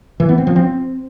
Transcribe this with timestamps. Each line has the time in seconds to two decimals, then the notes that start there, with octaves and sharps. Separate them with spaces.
0.20 E3
0.29 B3
0.38 C4
0.47 F3
0.56 C4